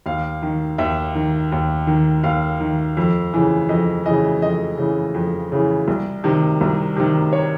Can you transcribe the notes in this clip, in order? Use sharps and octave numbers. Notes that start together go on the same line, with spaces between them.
D#2 F5
D#3
D#2 E5
D#3
D#2
D#3
D#2 F5
D#3
F2
C#3 E3
F2 D#5
C#3 E3 D#5
F2 D#5
C#3 E3
F2
C#3 E3
C2
C3 D#3
C2
C3 D#3
C#5